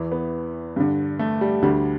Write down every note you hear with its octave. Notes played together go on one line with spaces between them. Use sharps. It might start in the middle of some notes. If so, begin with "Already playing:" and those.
Already playing: E2 E3
B3
G2 D3
A3
G3
D2 D3 G3